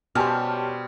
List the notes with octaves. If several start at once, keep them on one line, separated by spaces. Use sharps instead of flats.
B2 G3 C#4 G4 C5 A5 F6